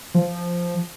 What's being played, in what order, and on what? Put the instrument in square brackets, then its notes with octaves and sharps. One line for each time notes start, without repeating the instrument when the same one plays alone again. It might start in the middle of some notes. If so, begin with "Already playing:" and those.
[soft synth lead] F3